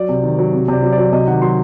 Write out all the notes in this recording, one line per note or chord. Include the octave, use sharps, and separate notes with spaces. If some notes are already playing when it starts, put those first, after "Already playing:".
Already playing: F#3 D5
C3
D#3
F#3
C3
C3 D5
F#3
D5
F#3
C3 D#5
D#3 F#5
F#3 C6